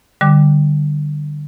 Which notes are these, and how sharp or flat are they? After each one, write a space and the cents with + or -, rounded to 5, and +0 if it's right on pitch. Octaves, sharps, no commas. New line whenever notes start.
D3 +20 G3 +0 D6 +0